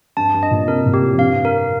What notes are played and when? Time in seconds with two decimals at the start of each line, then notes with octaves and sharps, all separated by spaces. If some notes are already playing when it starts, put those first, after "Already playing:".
0.17 G2 A5
0.34 G2
0.43 D#5
0.51 A#2
0.68 C3 A#4
0.86 A#2
0.94 G4
1.02 A2
1.13 F2
1.19 G2 F5
1.45 A#4